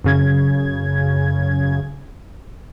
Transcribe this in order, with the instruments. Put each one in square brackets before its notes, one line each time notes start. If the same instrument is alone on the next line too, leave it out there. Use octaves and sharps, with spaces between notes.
[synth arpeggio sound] F#2 C#3 G#6